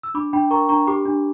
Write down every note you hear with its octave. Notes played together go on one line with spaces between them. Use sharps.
E6
D4 B5 D6
D4 G5 B5
A#4 A#5 C#6
D4 A#5 C#6
G4 B5 D6
D4